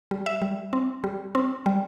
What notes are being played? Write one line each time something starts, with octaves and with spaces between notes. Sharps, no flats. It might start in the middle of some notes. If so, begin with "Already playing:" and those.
G3
E5
G3
C4
G3
C4
G3